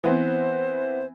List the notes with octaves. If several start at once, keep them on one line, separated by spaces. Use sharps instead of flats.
E3 B3 C4 C5